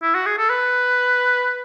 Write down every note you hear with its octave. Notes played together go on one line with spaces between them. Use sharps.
E4
F#4
G#4
A4
B4